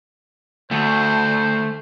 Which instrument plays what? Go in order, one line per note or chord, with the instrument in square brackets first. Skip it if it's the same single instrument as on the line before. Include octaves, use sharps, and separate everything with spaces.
[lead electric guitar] D2 [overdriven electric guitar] A3 [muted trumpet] C5